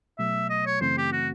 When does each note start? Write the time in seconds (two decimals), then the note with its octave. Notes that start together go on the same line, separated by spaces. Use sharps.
0.18 B2 F#3 A3 E5
0.50 D#5
0.66 C#5
0.81 F#2 C#3 E3 A3 C4 C5
0.97 G4
1.12 F#4